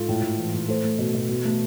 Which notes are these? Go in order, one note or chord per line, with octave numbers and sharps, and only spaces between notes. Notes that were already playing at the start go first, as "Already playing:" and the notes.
Already playing: G#2 F4 A4
A2
A2
E3
A2
A3 A4 C5
A3
B2
B2
B2
A3